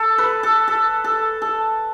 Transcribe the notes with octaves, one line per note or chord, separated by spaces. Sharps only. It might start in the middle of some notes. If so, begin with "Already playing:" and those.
Already playing: A4
B4
A4
A4
A4
A4